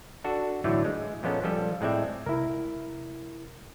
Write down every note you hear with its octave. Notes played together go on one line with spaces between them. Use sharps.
D4 F#4 A4
A2 D3 E3 F#3 A3
G#3
A#2 F3 G#3 B3 C#4 A4
F3 G3 A4
A2 G#3 C4 D5 E5
C3 G#3 E4 A#4